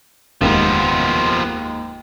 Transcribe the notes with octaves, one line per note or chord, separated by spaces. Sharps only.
F1 D#2 G#2 F3 B3